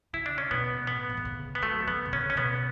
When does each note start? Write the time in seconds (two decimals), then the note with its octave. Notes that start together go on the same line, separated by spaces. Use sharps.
0.13 C#3 E4
0.26 D4
0.38 C#4
0.51 B2 B3
0.87 A2 B3
1.09 E3
1.17 D3
1.25 C#3
1.55 B3
1.62 F#3 A3
1.87 D3 B3
2.06 B2
2.12 C#3 C#4
2.30 C#4
2.37 B2 B3